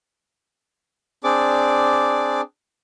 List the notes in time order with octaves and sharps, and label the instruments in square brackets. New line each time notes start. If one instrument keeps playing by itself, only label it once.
[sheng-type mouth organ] C4 D4 G#4 D5 D6